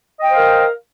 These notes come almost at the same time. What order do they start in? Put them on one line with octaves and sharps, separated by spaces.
D#5 G5 C5 F5 A#4